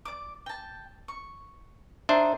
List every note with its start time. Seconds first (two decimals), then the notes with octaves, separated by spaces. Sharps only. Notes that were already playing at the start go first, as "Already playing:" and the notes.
0.05 D5 D6
0.46 G5 A5
1.08 C#6
2.09 D4 D#4 C5 E5